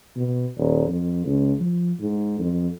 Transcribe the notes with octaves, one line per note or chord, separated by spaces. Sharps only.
B2
D#1
F2
C#2
F3
G#2
F2